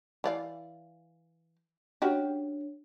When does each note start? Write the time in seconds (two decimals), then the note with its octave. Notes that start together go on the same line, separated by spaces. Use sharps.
0.24 E3 D5 F5
2.02 C#4 D4 F#4 G4 C#5